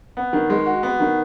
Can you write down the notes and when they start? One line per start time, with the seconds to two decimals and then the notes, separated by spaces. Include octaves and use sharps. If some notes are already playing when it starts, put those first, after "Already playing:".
0.17 B3
0.33 D#3
0.50 G#3
0.66 F#4
0.83 B3
1.00 D#3